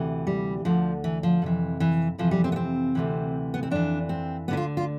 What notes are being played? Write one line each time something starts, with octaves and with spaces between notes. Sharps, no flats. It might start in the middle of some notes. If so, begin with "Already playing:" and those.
Already playing: D2 C3 E3
G3
D2 D3 F3
E3
F3
F2 C3 E3
E3
F2 C3 E3 F3
G3
C4
B3
C4
D2 C3 E3
B3
C4
F2 E3 D4
C4
D2 D3 B3 E4
F4
F4